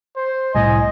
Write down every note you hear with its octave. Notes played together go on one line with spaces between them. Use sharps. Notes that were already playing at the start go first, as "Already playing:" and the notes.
C5
C2 A2 D#5 G#5